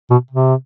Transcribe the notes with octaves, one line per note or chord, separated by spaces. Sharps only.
B2
C3